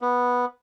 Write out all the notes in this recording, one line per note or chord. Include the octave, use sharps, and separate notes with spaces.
B3